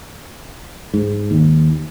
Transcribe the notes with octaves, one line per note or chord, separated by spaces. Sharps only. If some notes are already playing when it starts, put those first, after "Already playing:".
G#2
D#2